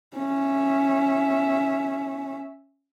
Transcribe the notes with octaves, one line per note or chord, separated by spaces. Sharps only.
C#4 E5